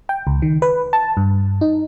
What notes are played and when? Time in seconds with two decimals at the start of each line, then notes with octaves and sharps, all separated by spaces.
0.09 G5
0.27 C#2
0.42 D#3
0.62 B4
0.93 A5
1.17 G2
1.61 D#4